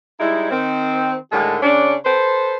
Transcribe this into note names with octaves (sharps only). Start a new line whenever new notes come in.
G3 G#3 D#4 E4
D#3 C4
A2 D3 D#3 G#3 A4
C#3 C#4 D4
A4 B4 C5